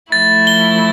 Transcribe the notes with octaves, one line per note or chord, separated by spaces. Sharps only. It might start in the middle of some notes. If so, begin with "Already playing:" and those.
F3 A3 E4 A6
G7